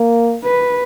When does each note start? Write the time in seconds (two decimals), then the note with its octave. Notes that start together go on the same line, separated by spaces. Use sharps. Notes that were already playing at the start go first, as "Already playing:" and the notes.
Already playing: A#3
0.44 B4